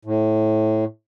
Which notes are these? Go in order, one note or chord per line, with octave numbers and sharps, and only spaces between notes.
A2